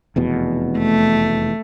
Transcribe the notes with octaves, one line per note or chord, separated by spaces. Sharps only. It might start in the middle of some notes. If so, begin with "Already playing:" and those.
F1 E2 B2
A3